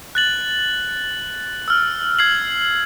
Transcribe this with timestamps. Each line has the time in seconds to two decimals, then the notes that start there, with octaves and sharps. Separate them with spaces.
0.15 F#6 A6 F#7
1.68 E6 F6
2.19 E6 G#6 C7 F#7